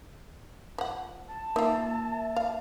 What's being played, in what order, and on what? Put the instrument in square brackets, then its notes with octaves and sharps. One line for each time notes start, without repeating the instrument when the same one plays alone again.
[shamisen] F3 F#5
[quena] A5
[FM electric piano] A#3 E5 [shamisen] D#4 F4
[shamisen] F5